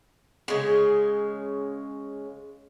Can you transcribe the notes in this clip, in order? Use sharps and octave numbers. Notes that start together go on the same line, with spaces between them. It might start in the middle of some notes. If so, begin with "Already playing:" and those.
C#3 G#3